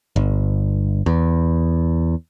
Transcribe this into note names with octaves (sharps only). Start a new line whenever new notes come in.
G1
E2